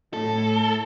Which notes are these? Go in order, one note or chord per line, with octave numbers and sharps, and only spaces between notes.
A2 A4